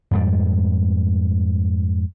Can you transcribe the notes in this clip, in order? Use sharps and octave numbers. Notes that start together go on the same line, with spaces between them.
F2 G#2 G3